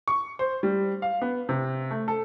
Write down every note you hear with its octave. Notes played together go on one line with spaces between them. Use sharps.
C#6
C5
G3
F5
B3
C3
A3
A4